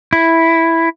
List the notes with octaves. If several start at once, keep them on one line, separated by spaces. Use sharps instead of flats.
E4